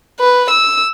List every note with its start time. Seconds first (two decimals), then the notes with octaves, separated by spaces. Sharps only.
0.20 B4
0.50 E6